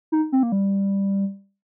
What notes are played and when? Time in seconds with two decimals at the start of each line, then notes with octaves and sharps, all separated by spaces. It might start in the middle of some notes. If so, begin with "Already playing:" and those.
0.12 D#4
0.32 C4
0.43 A#3
0.52 G3